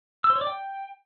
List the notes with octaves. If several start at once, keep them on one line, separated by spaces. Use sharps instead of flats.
E6
C5
C#5
D5
G5